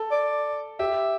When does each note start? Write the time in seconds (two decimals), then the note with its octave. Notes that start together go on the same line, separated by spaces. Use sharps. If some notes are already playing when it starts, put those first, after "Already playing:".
Already playing: A4
0.11 D5
0.79 G4 E5